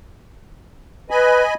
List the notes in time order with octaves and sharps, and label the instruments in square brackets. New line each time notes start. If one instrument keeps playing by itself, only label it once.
[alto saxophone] B4 [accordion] D#5 G#5 B5